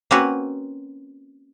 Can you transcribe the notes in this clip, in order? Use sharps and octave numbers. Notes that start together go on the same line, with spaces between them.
A#3 C4 C#4 F#4 B4